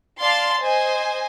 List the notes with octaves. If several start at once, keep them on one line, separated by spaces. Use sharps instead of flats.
D5 F5 A5 C6 A6
C5 D#5 G#5